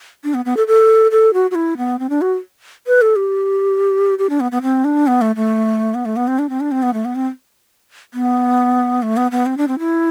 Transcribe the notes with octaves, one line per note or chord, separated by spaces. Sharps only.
D4
B3
B3
A4
A4
A4
F#4
F#4
E4
B3
C4
D4
F#4
B4
A4
G4
G4
D4
B3
B3
C4
D4
B3
A3
A3
B3
A3
B3
C4
D4
C4
D4
C4
B3
A3
B3
C4
B3
A3
B3
B3
C4
D4
C4
E4